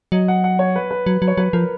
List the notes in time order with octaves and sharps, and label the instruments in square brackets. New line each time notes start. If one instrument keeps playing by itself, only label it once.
[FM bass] F#3 [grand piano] D#5
[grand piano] F#5
F#5
C#5
B4
B4
[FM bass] F#3
F#3
[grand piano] C#5
[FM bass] F#3 [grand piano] B4
[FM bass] F3 [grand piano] A#4